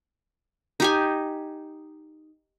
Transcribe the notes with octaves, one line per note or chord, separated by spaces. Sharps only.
D#4 G4 G#5